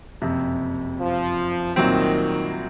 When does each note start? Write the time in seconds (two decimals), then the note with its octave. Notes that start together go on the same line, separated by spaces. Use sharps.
0.22 F#1 F2 C3
0.99 F3
1.76 C2 A#2 D#3 F#3 C4